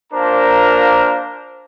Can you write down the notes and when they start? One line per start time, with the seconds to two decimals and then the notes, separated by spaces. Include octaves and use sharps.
0.13 A#3 D4 F4 A#4 C5 A#5